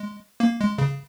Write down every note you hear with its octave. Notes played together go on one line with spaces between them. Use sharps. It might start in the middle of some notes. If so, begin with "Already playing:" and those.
Already playing: G#3
A#3
G#3
C#3